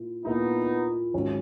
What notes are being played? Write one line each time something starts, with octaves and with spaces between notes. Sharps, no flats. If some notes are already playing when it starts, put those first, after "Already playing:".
Already playing: A#2 E4
A#2 A#3 B3 D#4 E4
G#1 G#2 F#3 C#4